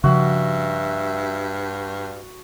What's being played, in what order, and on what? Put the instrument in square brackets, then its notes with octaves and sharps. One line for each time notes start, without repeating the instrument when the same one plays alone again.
[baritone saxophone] G2 [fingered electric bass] C#3 F3 [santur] F#4 [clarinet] E5